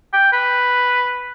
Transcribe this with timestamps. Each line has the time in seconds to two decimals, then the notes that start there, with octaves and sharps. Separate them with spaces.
0.13 G5
0.33 B4